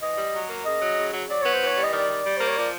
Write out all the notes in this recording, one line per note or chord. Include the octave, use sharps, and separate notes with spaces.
E3 D#5
G3
F#3
A#3
C#3 D#5
F#3
C#3
F#3
F#3 D5
B3 C#5
C5
E3
C#5
G3
D#5
D#3 D5
G3
G3
A#3 C5
C#5
F3 D5